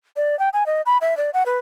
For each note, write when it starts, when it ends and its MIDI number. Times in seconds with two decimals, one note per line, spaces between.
0.16 0.38 74
0.39 0.49 79
0.53 0.66 80
0.66 0.82 75
0.86 0.98 83
1.01 1.17 76
1.17 1.30 74
1.34 1.44 78
1.46 1.59 71